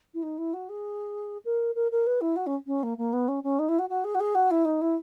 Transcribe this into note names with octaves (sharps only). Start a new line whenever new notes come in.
E4
D#4
E4
F#4
G#4
A#4
A#4
A#4
B4
E4
F#4
C#4
C#4
A#3
A#3
B3
C#4
C#4
D#4
E4
F#4
F#4
G#4
F#4
G#4
F#4
E4
D#4
E4